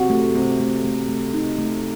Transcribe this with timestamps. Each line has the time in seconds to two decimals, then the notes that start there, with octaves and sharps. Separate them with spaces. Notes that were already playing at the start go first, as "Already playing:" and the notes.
Already playing: C3 F#4
0.10 A3
0.34 C3 A3
0.60 A3
0.85 A3
1.09 A3
1.34 D#4
1.59 A3